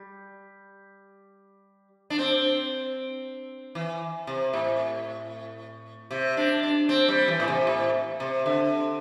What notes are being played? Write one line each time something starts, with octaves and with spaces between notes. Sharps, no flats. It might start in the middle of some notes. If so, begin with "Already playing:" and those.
Already playing: G3
D4
C4
E3
C3
A2
C3
D4
D4
C4
G3
E3
A2
C3
A2
C3
D3